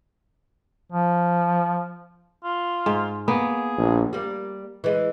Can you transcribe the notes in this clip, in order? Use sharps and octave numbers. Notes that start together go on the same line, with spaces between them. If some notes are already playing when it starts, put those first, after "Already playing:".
F3
F4
G#2
A#3 B3 G#4
A#1
G3 A#3
E3 G#3